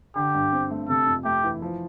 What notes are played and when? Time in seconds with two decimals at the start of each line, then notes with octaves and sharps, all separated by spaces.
0.15 D3 G4
0.34 G2
0.52 C4
0.71 A3
0.89 C3 A4
1.07 F2
1.25 A3 G4
1.44 E3
1.62 F3